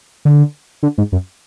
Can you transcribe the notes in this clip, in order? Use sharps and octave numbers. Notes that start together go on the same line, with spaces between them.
D3
D3
G#2
F#2